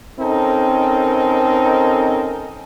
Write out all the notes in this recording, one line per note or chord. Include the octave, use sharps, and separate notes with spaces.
C4 C#4 D#4 A4 A#4